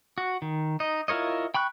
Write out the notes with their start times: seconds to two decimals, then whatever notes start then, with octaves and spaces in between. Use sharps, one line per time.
0.18 F#4
0.42 D#3
0.80 D#4 D#5
1.08 E4 F4 A#4 C#5 D#5
1.54 G5 B5 C#6 F#6